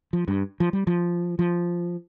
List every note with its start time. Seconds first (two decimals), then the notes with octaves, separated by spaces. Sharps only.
0.13 F3
0.28 G2
0.60 F3
0.73 G3
0.87 F3
1.39 F3